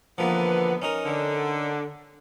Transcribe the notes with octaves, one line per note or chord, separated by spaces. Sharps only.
D3 E3 F3 A#3 B3
C#4 D#4 A#4
D3